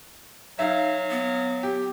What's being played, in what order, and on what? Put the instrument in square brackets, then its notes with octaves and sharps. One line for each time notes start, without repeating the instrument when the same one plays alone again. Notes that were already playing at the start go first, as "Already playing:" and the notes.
[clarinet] F#3 [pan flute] D#4 [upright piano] E5 F5
[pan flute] B3
[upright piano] G4